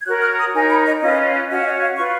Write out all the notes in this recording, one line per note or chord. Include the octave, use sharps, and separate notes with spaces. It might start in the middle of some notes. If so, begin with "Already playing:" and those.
G#6
F#4 A#4 C#5 F#6
F6
D#6
D#4 A#4 C#5 G#5
B5
D#5
C#4 F4 B4 D#5
C#4 F#4 C#5 D#5
F5
D#5
F5
F4 B4 C#6